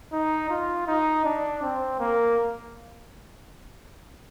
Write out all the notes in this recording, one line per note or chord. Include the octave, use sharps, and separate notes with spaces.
D#4
F4
D#4
D4
C4
A#3